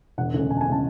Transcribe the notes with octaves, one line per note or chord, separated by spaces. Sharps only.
E1 F#5
D2 C#3 G#3
E1 G#5
A5
G#5
C#3 G#3 A5